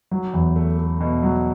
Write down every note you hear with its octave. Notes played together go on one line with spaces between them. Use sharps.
F#3
E2
A3
A3
B2
F#3